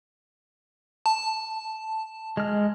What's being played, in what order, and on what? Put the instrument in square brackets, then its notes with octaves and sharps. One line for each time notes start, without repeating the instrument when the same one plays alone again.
[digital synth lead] A5
[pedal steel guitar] G#3 F6